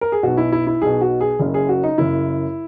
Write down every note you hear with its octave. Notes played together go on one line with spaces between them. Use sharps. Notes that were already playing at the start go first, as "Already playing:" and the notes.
A#4
G#4
B1 B2 F#4
E4
E4
E4
B1 B2 G#4
F#4
G#4
F#1 F#2 C#3
G#4
F#4
D#4
F#1 F#2 C#3 E4